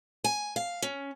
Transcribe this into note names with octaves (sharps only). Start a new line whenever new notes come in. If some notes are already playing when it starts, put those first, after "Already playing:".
G#5
F5
C#4